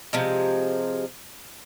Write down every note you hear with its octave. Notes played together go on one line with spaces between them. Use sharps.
C3 F3 G#3